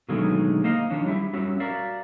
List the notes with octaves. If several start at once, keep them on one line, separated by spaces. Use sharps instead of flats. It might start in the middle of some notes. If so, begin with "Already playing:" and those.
B2 D3 D#3 F#3 G#3 A3
A#3 C5 D#5 F5
D#3 F3 C#4 D4
G3 E4 G4 E5
G3 C#4 F#4 E5
F#4 A#4 D5 E5 F5